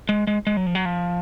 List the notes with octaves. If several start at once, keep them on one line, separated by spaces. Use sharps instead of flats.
G#3
G#3
G#3
F#3
F3
F#3
F3